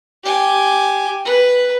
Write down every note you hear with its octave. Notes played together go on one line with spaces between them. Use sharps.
G4 G#5
B4